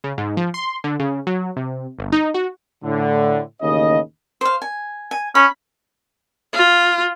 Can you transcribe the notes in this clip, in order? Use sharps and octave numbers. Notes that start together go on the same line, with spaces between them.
C#3
G#2
F3
C6
D3
C#3
F#3
C3
G1
D#4
F#4
A2 D3
A1 D#2 C#3 D#5
C5 F5
G#5
G#5
C#4 B5
F4